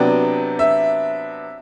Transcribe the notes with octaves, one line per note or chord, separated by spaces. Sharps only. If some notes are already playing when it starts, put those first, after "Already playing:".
Already playing: C3 F#3 B3 D4 G5
E5